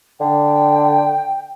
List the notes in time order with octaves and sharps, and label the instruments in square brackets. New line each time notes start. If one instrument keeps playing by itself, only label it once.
[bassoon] D3 [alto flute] G5